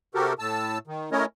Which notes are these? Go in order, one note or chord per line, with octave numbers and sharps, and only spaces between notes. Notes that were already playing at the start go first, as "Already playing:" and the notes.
C3 F#4 G4 A4 A#4
A2 A5 E6
D#3
A3 C#4 E4 A#4 C#5 D#5